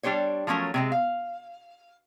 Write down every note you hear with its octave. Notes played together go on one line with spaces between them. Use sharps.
G3 D4 G4 C5 C#5
F3 F#3 A3 C#4 A#4
C3 G#3 C4
F5